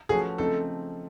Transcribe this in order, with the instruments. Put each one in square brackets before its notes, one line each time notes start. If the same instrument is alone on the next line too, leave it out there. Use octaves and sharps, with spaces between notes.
[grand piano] F3 A3 C#4 F#4 B4 [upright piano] G#4
[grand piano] C#3 F3 A3 C4 D#4 [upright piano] A4